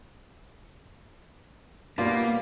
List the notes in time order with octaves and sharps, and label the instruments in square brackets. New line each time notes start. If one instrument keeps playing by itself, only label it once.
[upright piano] B2 G3 D5 [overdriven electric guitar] A#3 [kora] F4